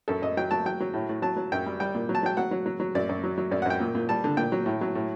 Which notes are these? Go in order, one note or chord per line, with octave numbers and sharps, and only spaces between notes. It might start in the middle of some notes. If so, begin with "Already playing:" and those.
F#2 A4
F#2 D#5
F#3 G5
F#3 A5
F#3 G5
F#3
A2
A2
F#3 A5
F#3
F#2 G5
G3
G3 G5
A#2
F#3
A5
F#3 G5
F#3 F#5
F#3
F#3
F#3
F#2 D5
F#2
F#3
F#3
F#2 D5
F#5
F#2 G5
A#2
A#2
G3 A5
D3
A#2 G5
F#3
A2
F#3
A2